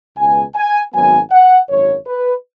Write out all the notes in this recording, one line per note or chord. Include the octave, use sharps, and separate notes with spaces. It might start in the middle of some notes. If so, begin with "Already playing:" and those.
C#2 B2 G#3 B3 G#5
G#5
G#1 F#2 F#3 B3 G#5
F#5
G#1 F#2 F#3 C#5
B4